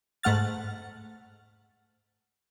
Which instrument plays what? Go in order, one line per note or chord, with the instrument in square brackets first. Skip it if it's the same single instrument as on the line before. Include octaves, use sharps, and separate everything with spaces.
[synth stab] G#2 A3 F#5 F6 A6